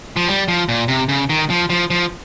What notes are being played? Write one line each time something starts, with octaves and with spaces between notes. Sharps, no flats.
F3
G3
F3
A#2
C3
C#3
D#3
F3
F3
F3